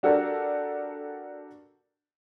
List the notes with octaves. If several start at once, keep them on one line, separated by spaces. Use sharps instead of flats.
D4 F#4 G4 A4 A#4 D5